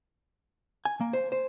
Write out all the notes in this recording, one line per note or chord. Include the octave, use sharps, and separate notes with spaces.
G#5
A#3
C5
C5